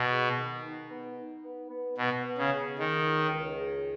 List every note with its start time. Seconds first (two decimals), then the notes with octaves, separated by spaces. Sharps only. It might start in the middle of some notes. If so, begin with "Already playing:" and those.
Already playing: B2
0.09 G#4
0.36 D#3
0.62 D#4
0.90 B3
1.16 D#4
1.43 B3
1.70 B3
1.97 B2 B3
2.24 B3
2.38 C#3
2.51 G#4
2.78 D#3 G#4
3.05 C#2
3.31 C#2
3.58 G#4